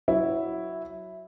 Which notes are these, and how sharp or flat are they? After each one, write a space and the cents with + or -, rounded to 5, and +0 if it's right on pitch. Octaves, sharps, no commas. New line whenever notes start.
F#3 +0 E4 +0